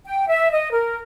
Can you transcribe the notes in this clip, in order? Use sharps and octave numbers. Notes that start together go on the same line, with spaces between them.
G5
E5
D#5
A#4